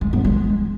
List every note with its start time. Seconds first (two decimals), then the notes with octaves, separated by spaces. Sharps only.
0.01 G#3
0.13 B3
0.25 G#3